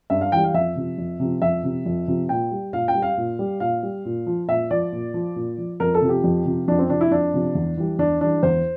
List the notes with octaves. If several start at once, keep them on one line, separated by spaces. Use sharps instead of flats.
G2 E5
F5
E3 G3 G5
F5
F2 E5
C3 F3
F2
C3 F3
F2 E5
C3 F3
F2
C3 F3
A#2 G5
G3
A#2 F5
G5
G3
F5
A#2
G3
A#2 F5
G3
A#2
F3
A#2 E5
F3 D5
A#2
F3
A#2
F3
F2 A#4
A4
C3 F3
G4
F2
C3 F3
F2 D4
C4
C3 F3 D4
E4
F2 D4
C3 F3
E2
E3 G3
E2 D4
E3 G3 D4
E2 C5